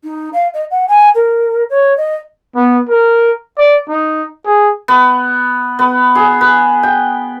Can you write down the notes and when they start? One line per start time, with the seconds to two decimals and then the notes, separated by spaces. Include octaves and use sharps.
0.04 D#4
0.33 F5
0.54 D#5
0.71 F#5
0.88 G#5
1.15 A#4
1.70 C#5
1.97 D#5
2.55 B3
2.89 A#4
3.58 D5
3.89 D#4
4.45 G#4
4.88 B3
5.79 B3
6.15 G#4
6.41 B4
6.83 G5